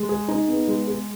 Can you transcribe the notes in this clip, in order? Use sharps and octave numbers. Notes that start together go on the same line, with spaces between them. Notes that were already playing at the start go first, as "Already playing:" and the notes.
Already playing: G#3
G#4
D#4
B3
G#3
G#4